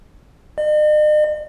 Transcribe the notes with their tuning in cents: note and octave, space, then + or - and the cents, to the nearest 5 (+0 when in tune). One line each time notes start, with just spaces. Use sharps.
D#5 -45